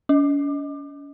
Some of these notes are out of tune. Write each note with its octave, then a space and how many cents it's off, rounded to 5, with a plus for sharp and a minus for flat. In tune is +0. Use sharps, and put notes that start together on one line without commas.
C#4 +45